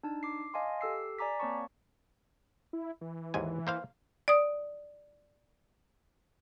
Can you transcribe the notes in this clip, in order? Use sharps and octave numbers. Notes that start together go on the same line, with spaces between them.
D4 D#4 A5
D6 C7
D#5 F5 G#5 A5 C6
G4 A4 E6 C7
D5 G#5 A#5 D6 B6
A#3 C4 C#5 A5 C#6
E4
E3
D#2 G#2 G#5
A#3 C5 F5
D5 D#6